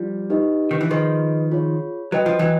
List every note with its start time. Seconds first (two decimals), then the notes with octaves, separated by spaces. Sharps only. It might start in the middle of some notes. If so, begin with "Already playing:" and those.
Already playing: F3 G3
0.30 D#4 G4 B4 D#5
0.71 D#3
0.81 E3
0.91 D#3 F3 G#4 B4 D#5
1.52 F4 G#4 C#5
2.12 F#3 F#4 B4 D#5 G5
2.26 F3
2.39 E3 F#3